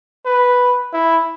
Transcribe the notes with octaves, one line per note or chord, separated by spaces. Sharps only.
B4
E4